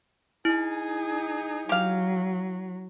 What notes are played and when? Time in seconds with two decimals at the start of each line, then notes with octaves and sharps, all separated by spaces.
0.45 D#4 E4 G#4
1.69 F#3 G4 F5